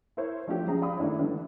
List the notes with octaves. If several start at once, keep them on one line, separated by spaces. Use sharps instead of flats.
E4 A#4 C5 C#5
F3 A3 D4 F4 G4
B1 C#3 F3 G#4 A#5
D5 F5 B5 D#6
D#3 A3 D4 E4 C#5
D3 E3 G3 A3